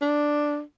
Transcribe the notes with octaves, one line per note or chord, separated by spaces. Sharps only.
D4